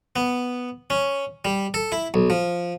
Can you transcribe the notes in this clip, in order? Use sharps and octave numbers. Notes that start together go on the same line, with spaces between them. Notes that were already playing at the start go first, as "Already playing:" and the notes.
B3
C#4
G3
A4
E4
B1
F3